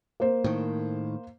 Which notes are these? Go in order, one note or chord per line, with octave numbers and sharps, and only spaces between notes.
A#3 C5
A2 D#3